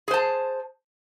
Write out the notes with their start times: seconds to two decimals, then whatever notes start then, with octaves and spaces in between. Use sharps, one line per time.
0.08 G#4
0.11 C5
0.14 A5